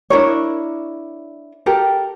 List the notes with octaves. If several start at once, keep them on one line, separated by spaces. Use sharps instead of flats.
D4 E4 A#4 C#5
G4 A4 A#4